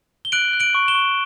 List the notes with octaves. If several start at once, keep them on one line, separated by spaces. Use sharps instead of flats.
G7
F#6 D7 F#7
F#6
D7 F#7
C#6
E7 G7
C#6